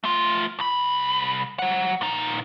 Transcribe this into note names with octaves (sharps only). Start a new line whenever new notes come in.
A3 F4
C2 B5
F#3 F#5
A#2 D#4